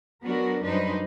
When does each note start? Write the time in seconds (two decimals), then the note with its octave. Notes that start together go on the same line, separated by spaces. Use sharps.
0.24 F#3 B3 D4 F#4 A#4
0.64 F#2 G3 D4 D#4 B4 C5